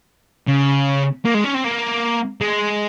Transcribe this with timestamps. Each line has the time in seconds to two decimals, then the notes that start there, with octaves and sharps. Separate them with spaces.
0.48 C#3
1.25 A#3
1.34 G#3
1.44 C#4
1.54 C4
1.64 A#3
2.41 G#3